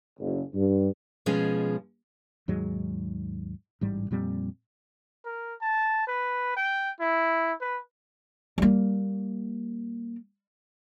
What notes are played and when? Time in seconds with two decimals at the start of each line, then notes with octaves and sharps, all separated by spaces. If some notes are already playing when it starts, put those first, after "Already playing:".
0.20 F#1
0.54 G2
1.26 B2 F3 G#3 C#4 G#4
2.48 D#2 G#2 F#3 G#3
3.81 A1 G#2 G3
4.11 F2 A#2 G3 C4
5.25 A#4
5.62 A5
6.07 B4
6.56 G5
7.00 E4
7.61 B4
8.58 G3 A#3